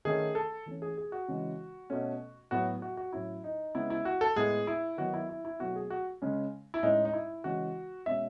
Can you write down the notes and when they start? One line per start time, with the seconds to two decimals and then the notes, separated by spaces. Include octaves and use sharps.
0.05 D#3 A3 C#4 G#4
0.35 A4
0.66 E3 A3 C#4
0.82 G#4
0.98 G#4
1.12 F#4
1.28 C#3 E3 G#3
1.90 B2 A3 C#4
2.51 A2 F#3 B3 F#4
2.82 F#4
2.97 F#4
3.13 A2 F#3 C#4 E4
3.44 D#4
3.75 C#3 G#3 B3 E4
3.90 E4
4.05 F#4
4.21 A4
4.36 A2 G#3 B3 G#4
4.67 E4
4.98 D#3 F#3 B3 F#4
5.14 E4
5.29 E4
5.45 E4
5.59 B2 F#3 A3 F#4
5.76 G#4
5.90 F#4
6.22 C#3 G#3 C#4
6.74 E4
6.83 A2 G#3 C#4 D#4
7.05 D#4
7.13 E4
7.44 C#3 E3 G#3 C#4 F#4
8.06 B2 G#3 C#4 E5